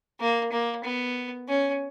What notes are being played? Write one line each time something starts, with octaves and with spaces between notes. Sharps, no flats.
A#3
A#3
B3
C#4